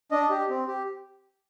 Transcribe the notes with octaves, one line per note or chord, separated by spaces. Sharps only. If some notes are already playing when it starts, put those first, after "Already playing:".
D4 D#5
G4
C4
G4